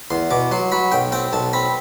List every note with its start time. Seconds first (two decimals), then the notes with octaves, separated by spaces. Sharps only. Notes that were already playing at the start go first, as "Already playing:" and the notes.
0.10 E2 C6
0.30 B2 D6
0.51 F#3 C6
0.72 F#3 B5
0.92 B1 G5
1.12 C4 G5
1.33 B1 A5
1.53 C4 B5